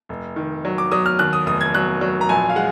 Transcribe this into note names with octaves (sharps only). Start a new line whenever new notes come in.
F1
D#3
F#3
D6
F#3 D#6
F6
D#2 F#6
D#6
F1 D#6
G#6
F#3 F#6
F#3
A#5
A#1 G#5
F5
G#3 F#5